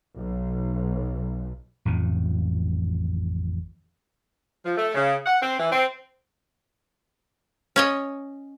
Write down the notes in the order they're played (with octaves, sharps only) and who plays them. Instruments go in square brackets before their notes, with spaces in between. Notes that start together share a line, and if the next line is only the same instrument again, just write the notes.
[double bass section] B1
[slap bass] A1 F2 D#3
[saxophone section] F3
A3
C#3
F#5
C4
E3
C4
[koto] C#4 C#5 D#5